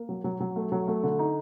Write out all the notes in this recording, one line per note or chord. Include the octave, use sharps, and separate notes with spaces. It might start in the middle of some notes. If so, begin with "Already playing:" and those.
Already playing: A#3
F#3
F#3
F#3
A3
F#3
A3
D3
D#4